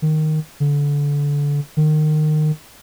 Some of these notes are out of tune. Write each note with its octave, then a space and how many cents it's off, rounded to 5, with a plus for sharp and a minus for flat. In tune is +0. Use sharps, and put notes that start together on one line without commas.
D#3 -5
D3 -25
D#3 -25